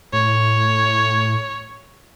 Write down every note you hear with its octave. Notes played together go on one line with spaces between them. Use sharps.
A2 C#5